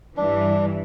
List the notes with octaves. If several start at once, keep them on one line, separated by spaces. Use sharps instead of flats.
G2 E3 D4